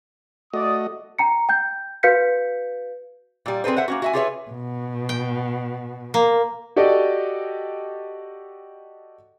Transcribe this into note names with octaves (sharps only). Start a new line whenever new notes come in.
A3 F#4 D5 D#5 D#6
G5 A#5 C#7
G5 G6
F#4 B4 F5 G6 B6 C#7
A#2 G3
C4 G#4 A4 B4 C5
C5 E5 F#5
A#3 C#4 F#4
F#4 E5 G#5
F4 G4 G#4 B4 C#5 E5
B2
G5
A#3
F#4 G4 A4 D5 D#5